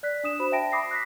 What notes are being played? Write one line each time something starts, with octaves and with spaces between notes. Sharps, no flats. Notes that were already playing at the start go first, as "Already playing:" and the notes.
D5 F#6 B6
D4 D#6 E7
F#4 C5 B5 E7
E5 G5 A5 A#6 D7
B5 D6 D#6 A#6 C7
F#6 A#6 B6